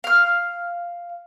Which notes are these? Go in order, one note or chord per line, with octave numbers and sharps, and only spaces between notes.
F5 F6